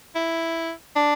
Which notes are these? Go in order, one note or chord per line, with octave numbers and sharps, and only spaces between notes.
E4
D4